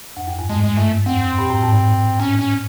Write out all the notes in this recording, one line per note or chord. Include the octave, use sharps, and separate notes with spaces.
F2
F#2
G2
G#2 G#3
G#3
G2 A3
F2 C4
A#2
A2
G#2
A2 C#4
C#4